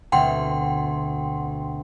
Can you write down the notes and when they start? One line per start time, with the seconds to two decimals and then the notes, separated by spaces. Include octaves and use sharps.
0.12 D2 B2 C4 F#5 G5 C6